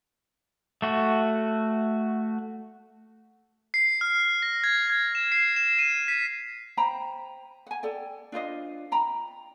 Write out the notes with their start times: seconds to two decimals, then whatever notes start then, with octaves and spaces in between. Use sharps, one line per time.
0.82 A3 F#4
3.74 C7
4.01 F6
4.42 A#6
4.64 G#6
4.90 G#6
5.15 E7
5.32 C7
5.56 E7
5.79 D#7
6.08 B6
6.77 C5 G5 A#5 B5
7.67 F#5 G#5
7.83 A4 D5 G5
8.32 D4 F4 C5 D#5
8.92 G5 A#5 B5